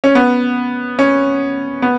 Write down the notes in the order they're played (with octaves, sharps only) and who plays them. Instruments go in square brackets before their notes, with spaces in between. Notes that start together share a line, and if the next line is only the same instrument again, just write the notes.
[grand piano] C#4
B3
C#4
B3